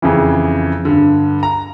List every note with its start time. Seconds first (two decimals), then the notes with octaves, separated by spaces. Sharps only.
0.02 F2 C#3 E3
0.85 G2 D3
1.43 A#5